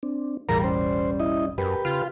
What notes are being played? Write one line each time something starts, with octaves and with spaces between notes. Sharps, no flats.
C4 D4
E1 A1 E3 G3 G#4 A#4 F5 A#5
C#4 C5
E4 D#5
F#2 G4 A#4 B4
C#3 F4 F5 F6